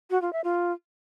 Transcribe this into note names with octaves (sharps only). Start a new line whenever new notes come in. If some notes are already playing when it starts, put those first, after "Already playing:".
F#4
F4
E5
F4